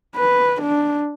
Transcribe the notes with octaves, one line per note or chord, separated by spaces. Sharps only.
B4
D4